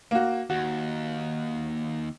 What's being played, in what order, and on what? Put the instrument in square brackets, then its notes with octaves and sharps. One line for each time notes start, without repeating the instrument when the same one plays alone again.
[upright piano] A#3 F#4
[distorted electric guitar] D#2 [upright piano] F#4